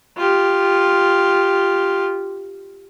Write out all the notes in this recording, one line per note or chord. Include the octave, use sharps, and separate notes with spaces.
F4 G4